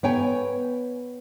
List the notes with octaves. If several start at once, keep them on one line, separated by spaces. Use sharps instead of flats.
B3 C#5 G5 G#5